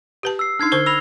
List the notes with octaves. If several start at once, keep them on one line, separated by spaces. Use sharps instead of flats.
G4 B4 A5
E6 C7
D4 D#4 F6 G#6 C7
D3 C5 C#6 G7
B5 E6 A#6 F7